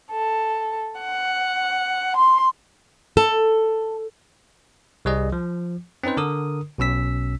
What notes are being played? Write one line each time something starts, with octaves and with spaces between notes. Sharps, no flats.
A4
F#5
C6
A4
C2 G3 G#4 D#5
F3
C4 C#4 D#4 B4 C5
D3 A#4 D#6
B1 B2 C#4 E6 B6